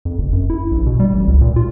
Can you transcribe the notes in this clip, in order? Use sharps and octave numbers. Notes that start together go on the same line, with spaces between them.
F2
F#1
F#2
E4
A#1
B2
G3
A1
C#2
A#2
F4